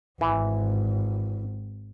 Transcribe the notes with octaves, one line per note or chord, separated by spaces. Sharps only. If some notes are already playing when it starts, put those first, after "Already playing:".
G#1 E3